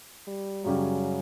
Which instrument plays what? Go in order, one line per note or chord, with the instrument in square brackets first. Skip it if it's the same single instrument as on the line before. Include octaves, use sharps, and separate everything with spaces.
[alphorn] G3
[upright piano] F#2 C#3 G3 C#4 G4 [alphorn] F#3